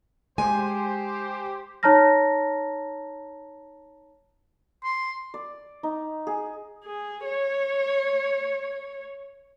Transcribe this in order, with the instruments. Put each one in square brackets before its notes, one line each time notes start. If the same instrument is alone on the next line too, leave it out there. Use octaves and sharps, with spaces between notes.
[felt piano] G#3 [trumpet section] G4 C5 [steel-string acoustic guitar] G#5
[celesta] D#4 C#5 A5 A#5 F6 A#6
[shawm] C6
[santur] D5
D#4
G#4
[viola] G#4
C#5